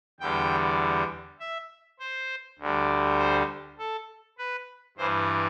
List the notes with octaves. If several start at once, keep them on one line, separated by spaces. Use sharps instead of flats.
E2 D3 G3 G5
E5
C5
D2 D3 G3
C5
A4
B4
G2 E3 G3 C5